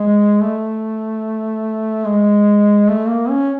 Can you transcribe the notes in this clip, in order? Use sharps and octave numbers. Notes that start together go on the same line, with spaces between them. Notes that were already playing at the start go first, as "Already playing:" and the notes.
Already playing: G#3
A3
G#3
A3
A#3
C#4